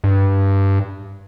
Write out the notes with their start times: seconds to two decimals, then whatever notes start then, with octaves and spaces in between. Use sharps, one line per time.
0.04 G2